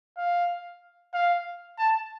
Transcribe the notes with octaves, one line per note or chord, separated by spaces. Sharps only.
F5
F5
A5